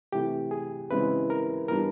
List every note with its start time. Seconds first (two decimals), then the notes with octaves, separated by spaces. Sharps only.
0.12 C3 E3 A3 G4
0.51 G#4
0.91 C#3 E3 G#3 C4 E4 B4
1.30 A#4
1.68 E3 G3 B3 D4 A#4